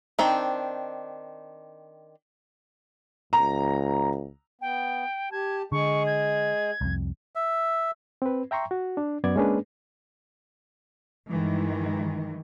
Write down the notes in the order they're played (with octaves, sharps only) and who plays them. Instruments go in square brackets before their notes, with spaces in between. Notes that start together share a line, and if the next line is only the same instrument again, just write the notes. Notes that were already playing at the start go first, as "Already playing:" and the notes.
[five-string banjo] D#3 C4 D4
[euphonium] C#2 [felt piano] A#5
[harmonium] B3 [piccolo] G5
[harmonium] G4 A5 [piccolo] G#6
[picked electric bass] D3 [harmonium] G#3 G#4 [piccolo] C#6
[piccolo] G#6
[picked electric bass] C2 F2
[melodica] E5
[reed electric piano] C4 B4
E5 G5 A#5 C6 C#6
F#4
D4
F#2 B3 D5 G#6
G#3 A#3 C#4 D4 G#4 B4
[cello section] G2 D#3 E3 G#3